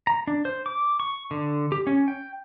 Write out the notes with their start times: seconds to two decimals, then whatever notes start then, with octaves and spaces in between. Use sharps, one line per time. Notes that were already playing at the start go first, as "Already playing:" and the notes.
0.07 A#5
0.27 D4
0.45 C5
0.66 D6
1.00 C#6
1.31 D3
1.72 G4
1.87 C#4
2.08 G5